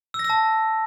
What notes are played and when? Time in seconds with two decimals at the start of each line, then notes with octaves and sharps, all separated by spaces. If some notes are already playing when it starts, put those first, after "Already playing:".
0.14 E6
0.19 A#6
0.24 E6
0.30 A5